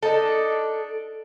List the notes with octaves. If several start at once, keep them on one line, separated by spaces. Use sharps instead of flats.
D4 D#4 A4